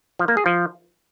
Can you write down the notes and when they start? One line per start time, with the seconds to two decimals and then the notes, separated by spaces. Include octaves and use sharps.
0.19 F3
0.28 A#3
0.37 G#4
0.46 F3